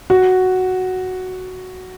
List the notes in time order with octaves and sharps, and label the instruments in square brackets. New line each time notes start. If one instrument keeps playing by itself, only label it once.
[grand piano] F#4